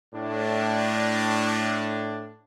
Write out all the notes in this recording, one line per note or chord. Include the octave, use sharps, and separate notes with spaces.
A2 D4